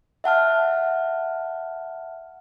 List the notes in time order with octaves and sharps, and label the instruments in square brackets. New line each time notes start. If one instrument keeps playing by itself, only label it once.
[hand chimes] E5 F#5 A5 F6